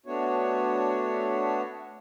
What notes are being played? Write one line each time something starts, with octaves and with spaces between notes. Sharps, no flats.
A3 B3 D4 F#4 C#5